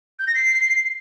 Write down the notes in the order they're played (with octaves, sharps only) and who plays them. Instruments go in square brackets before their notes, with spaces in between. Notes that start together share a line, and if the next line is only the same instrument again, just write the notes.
[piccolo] G6
A#6
C7